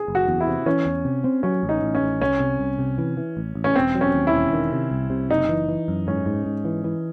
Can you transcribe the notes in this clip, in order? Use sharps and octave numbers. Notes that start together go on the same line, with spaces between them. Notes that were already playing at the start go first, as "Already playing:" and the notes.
Already playing: G#4
F#1
F#4
E2
E4
C3
E3 C#4
E2
C3
C4
F#3 C#4
A1
D#4
A1
C#4
A1
C2 C#4
C3
C2
C3
E3
E3
A1
A1
C#4
E1 C4
F#3
C#4
D#2
E4
E1
D#3
C3
C2
C3
F#1 D#4
E3
E3
F#2
G#2 C#4
G#2
G#2
E3
E3